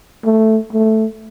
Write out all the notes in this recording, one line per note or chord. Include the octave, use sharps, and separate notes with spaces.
A3
A3